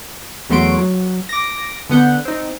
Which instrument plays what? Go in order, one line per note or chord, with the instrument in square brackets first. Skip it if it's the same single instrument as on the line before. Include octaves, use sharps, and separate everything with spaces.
[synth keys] E2 F#3 A3 F#4 C6 D7
F#3
D6 A#6
D3 B3 F#5 G6
C4 D#4